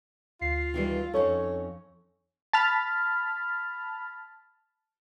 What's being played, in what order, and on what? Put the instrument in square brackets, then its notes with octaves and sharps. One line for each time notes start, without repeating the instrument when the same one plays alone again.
[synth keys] D2 C7 [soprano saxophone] F4
[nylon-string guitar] D#3 E3 G3
[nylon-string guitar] F2 C#4 D#4 [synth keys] A4 C#5 C#6
[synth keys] A5 B5 F6